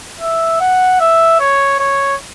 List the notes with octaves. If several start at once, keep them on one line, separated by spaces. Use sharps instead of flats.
E5
F#5
E5
C#5
C#5